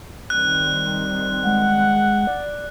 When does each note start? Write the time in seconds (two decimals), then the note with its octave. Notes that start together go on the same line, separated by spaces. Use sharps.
0.30 D#3 G3 C4 F#6
1.45 G#3 F#5
2.27 D5